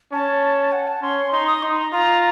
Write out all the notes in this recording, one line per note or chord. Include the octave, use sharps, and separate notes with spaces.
C#4 A5
F#5
A5
C#4 C6
D#4 C6
D#6
D#4 C6
A#5
F4 A#5